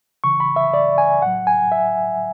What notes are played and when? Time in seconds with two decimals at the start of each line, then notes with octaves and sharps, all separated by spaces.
0.24 C#3 E3 C#6
0.40 B5
0.56 E5
0.74 D5
0.98 G#5
1.22 A2 F#3 F#5
1.47 G#5
1.72 E5